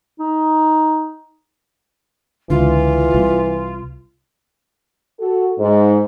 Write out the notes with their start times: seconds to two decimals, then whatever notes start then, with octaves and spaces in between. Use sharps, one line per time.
0.20 D#4
2.50 C#2 D3 E3 F4
3.14 C2
5.19 F#4 A4
5.59 G#2